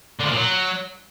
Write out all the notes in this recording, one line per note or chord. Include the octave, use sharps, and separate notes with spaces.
D3
F3
A#2
F#3